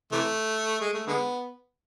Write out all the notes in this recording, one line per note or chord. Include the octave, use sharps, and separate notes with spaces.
C3 E3 A3
G#3
A3
D3 G#3 B3